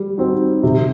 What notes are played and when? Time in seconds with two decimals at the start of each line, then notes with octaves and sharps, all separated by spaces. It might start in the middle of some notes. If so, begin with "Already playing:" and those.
Already playing: G3
0.18 C4 D#4 F#4
0.63 C3